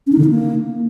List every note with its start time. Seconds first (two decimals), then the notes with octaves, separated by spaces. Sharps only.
0.07 C#4
0.13 D#4
0.18 D3
0.24 D#4
0.30 A#3